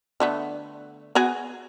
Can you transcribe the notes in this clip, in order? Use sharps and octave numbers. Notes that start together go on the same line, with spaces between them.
D3 A3 B3
B3 F#4 G#4